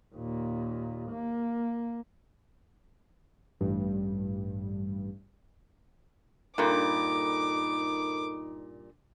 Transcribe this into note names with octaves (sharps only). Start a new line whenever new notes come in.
D#2 A#2
A#3
A1 G2
G2 A#2 D#4 A4 A#4 B5 D6